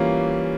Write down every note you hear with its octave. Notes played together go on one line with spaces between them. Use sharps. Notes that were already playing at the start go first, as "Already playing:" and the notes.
Already playing: E3 G3 A#3 C#4 F4